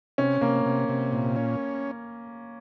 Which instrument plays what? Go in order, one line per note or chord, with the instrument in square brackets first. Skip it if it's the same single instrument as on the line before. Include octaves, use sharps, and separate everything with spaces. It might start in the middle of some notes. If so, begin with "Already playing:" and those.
[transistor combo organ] C3 [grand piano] C#4
[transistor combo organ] C3 [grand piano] A#3
[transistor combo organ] C3
C3
A#2
C#4